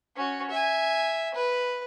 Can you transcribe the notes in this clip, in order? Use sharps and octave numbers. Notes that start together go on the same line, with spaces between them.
C#4 F#4
E5 G#5
B4